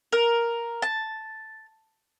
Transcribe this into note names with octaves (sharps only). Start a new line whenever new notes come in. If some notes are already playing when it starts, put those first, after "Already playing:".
A#4
A5